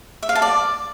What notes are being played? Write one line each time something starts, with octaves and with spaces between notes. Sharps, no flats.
E5
F5
A5
D5